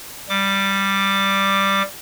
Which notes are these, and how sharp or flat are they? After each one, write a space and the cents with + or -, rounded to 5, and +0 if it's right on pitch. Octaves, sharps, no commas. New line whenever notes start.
G3 +0 D6 +5